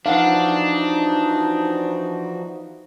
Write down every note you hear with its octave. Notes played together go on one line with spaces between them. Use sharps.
E3 F3 D4 D#4 F#4 F5 F#5